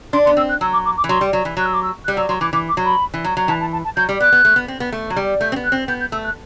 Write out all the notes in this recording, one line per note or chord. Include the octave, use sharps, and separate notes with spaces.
D4 C6
B3 C6
C4 E6
F#6
F#3 E6
D6
D6
D6
E3
F#3 C6
G3
F#3
E3
F#3 F#6
E6
D6
E6
F#6
G3
F#3 E6
F#3 C6
E3 D6
E3 D6
D6
F#3
B5
E3
F#3
F#3
E3 A5
A5
A5
A5
F#3 G6
G3
B3 F#6
B3
A3
B3
C4
B3
A3
F#3
G3
A3 G6
C4
B3
F#6
C4
B3 G6
G6
A3 E6
F#6